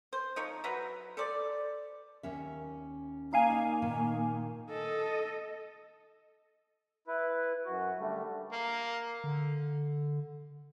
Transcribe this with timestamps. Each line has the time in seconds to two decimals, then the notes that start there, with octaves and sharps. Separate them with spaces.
0.13 C5
0.36 F3 D#4 C#5
0.64 F#3 B4 E5 A#5
1.17 A4 C5 D5
2.23 D#2 C#4 E5
3.33 A#3 D#4 F5 G#5
3.50 D5
3.82 A#2 D#3
4.70 A4 D#5
7.07 E4 B4
7.65 F#2 F#4
7.99 D3 G3 A3
8.52 A#3
9.24 D3